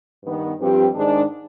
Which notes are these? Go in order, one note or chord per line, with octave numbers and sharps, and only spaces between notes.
G2 D#3 B3
G2 F3 C4 G4
G#2 D#3 G#3 D4